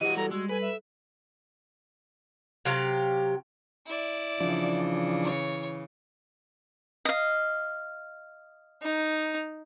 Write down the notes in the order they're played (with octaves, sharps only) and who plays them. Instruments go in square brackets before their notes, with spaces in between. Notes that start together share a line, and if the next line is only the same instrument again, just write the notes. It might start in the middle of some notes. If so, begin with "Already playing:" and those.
[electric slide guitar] E3 F#4 [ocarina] G4 [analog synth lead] D#5 [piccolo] D#7
[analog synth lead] G3 [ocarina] A4 [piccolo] A#5
[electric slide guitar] G#3 [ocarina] F#4 [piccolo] E6
[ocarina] A4 [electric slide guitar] B4 [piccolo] G#5
[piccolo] E5
[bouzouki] C3 F#3 G4 F5
[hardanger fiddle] E4 D5
[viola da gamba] C#3 E3 [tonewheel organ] F3 D4
[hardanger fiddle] C#5
[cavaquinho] D#5 F5
[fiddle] D#4